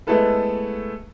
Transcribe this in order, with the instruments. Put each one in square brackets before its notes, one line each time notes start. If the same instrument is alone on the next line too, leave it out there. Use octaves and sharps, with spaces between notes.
[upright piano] G#3 A3 B3 E4 A4 B4